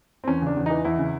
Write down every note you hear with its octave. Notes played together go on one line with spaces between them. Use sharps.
C4
E2 C#4
C#3 D4
E2
E3 D#4
E2 E4
C#3